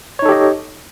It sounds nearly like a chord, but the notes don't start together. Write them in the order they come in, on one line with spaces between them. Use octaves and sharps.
C#5 D#4 A4 G4 D#5